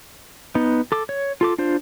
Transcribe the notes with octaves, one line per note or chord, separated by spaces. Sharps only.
B3 D#4
A4 D6
C#5
F4 A4 D6
D4 F4 C5